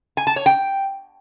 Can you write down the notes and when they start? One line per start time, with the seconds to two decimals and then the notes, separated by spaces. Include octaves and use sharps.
0.17 G#5
0.27 A5
0.36 C#5
0.46 G5